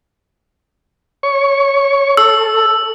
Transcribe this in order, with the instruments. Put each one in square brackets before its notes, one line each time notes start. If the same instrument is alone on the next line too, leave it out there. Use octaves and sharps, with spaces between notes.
[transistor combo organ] C#5 C#6
[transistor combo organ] A4 [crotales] E6